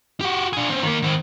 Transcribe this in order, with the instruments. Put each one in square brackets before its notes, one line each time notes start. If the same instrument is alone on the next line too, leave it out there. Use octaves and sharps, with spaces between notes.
[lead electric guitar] F#4 G4
D4 G#4
C4 C#4
D#3 A#3
D#3 C4